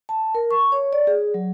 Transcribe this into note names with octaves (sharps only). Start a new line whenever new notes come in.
A5
A#4
C#6
C#5
D5
G#4
F#3